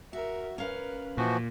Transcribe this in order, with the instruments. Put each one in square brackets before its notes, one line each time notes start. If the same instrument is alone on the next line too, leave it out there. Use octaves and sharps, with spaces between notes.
[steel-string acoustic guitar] F#4 [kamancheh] A#4 E5
[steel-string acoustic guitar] C#4 F5 [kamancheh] A#4 B4
[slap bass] A#2 [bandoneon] E3 F3 F#4